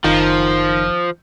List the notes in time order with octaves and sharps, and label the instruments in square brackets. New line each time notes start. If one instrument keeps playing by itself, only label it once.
[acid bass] F#1 [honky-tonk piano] D#3 [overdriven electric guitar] F3